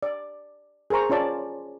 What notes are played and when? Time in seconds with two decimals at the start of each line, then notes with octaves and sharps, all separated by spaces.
0.03 D5
0.90 G#4 A#4 C5 A#5 C#6
1.10 C#4 F4 C#5 D5 A5